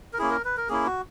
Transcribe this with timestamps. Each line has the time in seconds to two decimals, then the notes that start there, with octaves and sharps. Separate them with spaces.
0.13 A#4
0.18 A#3 C#4 E4 G#4
0.31 A#4
0.45 B4
0.57 A#4
0.69 A#3 C#4 E4 G#4
0.86 F#4